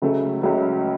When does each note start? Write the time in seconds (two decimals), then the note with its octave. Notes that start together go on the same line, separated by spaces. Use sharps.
0.02 C#2 C#3 F#3 A3
0.42 C#2 C#3 F#3 A3